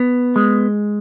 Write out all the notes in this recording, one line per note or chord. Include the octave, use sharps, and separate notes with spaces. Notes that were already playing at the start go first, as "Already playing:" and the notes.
Already playing: B3
G#3